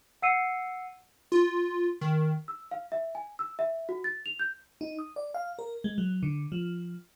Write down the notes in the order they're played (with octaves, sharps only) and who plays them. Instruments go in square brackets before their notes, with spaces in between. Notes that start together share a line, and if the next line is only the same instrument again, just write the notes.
[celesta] F#5 E6 C7 C#7 D#7
[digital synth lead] F4
D#3
[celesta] E6
F5
E5
G#5
E6
E5
F#4
A6
F7
G6
[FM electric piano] D#4
D#6
D5
F5
A#4
G#3
F#3
D3
F3